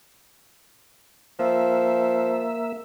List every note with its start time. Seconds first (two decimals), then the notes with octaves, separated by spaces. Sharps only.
1.39 F3 A#3 E5